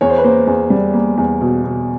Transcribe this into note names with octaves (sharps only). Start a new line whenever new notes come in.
E2 C#5
C5
B4
A#3 C5
E2
G3
A#3
E2
B2
B2